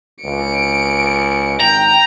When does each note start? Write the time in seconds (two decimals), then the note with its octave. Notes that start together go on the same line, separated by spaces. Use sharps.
0.25 C#2 C#7 D7
1.60 G#1 G5 A#5